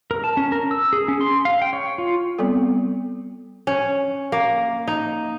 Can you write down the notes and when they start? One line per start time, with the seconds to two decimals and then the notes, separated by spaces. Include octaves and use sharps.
0.11 A#4
0.24 A5
0.37 C#4
0.52 A#4
0.71 E6
0.93 G#4
1.08 C#4
1.21 C6
1.45 F5
1.62 G5
1.73 C#5
1.98 F4
2.39 G3 B3 C4 A4
3.67 C#4
4.32 A#3
4.87 D#4